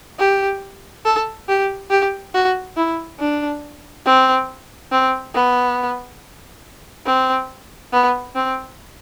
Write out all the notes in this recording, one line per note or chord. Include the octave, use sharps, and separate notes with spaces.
G4
A4
G4
G4
F#4
E4
D4
C4
C4
B3
C4
B3
C4